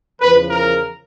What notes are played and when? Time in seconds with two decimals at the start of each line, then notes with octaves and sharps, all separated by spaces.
0.21 E2 C#3 F3 B4
0.49 A#4